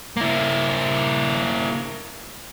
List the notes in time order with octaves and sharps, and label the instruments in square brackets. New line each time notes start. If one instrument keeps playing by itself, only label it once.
[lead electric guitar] A#3 E4